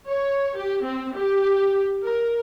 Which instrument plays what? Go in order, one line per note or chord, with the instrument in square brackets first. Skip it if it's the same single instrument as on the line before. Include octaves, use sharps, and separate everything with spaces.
[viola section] C#5
G4
C4
G4
A#4